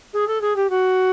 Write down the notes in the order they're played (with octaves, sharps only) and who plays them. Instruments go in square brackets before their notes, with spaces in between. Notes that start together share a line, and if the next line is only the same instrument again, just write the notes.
[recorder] G#4
A4
G#4
G4
F#4